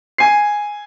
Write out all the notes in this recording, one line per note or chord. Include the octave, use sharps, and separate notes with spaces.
G#5 C7